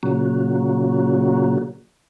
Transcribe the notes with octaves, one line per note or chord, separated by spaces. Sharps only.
A#2 C#3 F#3